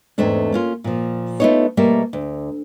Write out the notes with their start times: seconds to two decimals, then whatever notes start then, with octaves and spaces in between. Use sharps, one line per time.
0.18 E2 G#2 A3 C4 D4
0.52 A#3 C#4 F4
0.84 A#2 F3
1.40 A3 B3 C4 D#4 F4 C#5
1.77 B2 G3 A3 A#3 A#4 E5
2.13 D2